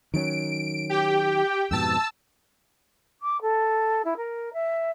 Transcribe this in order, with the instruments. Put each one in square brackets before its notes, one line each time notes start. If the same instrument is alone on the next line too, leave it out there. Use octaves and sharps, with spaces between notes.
[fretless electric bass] D#3 F#3 C#4 [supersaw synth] D7
[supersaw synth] G4 G5
[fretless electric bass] F2 G#2 B2 [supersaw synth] A5 E6
[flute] D6
A4
E4
A#4
E5